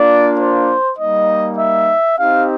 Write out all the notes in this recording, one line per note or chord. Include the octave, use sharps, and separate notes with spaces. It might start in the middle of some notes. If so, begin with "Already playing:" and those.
Already playing: A#3 D4 F4 D5
C5
G3 A#3 D#4 D#5
E5
C4 D#4 G4 F5